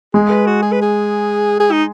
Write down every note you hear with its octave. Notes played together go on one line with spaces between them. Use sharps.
G#3 G#4
B4
F#4
G#4
B4
G#4
G#4
D#4